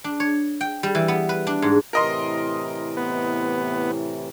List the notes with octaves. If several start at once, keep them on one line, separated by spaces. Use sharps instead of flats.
D4
C#5
G5
G3
E3
B3
B4
D4
G#2
A2 C3 E3 A#4 D#5 C6
B3